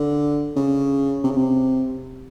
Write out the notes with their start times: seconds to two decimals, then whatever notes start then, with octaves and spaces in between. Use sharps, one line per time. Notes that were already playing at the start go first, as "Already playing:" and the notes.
Already playing: D3
0.56 C#3
1.24 C3
1.31 C#3
1.37 C3